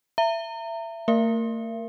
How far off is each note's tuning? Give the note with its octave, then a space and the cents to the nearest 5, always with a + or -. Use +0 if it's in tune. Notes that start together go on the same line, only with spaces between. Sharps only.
E5 +25 A#5 -30
A3 +45 A#4 +0 E5 +45